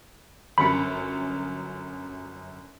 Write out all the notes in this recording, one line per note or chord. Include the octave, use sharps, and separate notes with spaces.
G1 F#2 B5 C#7